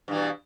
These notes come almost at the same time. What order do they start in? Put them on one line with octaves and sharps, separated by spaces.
G2 E3 B2